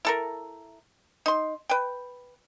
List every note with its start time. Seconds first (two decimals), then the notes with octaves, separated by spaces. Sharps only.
0.05 E4 A4 A#4
1.26 D#4 C6
1.69 B4 G5